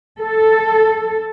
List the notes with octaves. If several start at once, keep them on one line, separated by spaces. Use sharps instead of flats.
A4